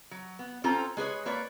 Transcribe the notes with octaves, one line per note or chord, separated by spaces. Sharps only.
F#3
B3
C4 C#4 F4 A4 C5 A#5
G#3 G#4 B4 C#5
A#3 B4 C#5 D5